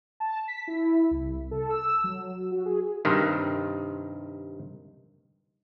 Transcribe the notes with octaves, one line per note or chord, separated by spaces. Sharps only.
A5
B6
E4
C2
A4
E6
F#3
F#4
G#4
G2 C3 D#3